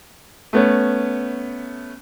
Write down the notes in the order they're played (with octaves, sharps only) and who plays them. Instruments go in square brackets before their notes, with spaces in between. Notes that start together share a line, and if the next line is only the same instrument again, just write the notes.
[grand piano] A3 B3 C#4